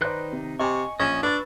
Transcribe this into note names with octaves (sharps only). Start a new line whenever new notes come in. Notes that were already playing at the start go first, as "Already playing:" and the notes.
D#3 D#4 B4 C5 D5 F#6
C3
C3 D#5 G#5 C#6
A#1 C#4 D#5 G#5 E7 G7
D4 B4 C#6 E6 A6